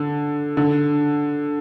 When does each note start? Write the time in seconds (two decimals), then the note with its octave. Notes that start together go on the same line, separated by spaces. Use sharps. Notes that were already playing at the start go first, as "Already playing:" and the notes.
Already playing: D3
0.57 D3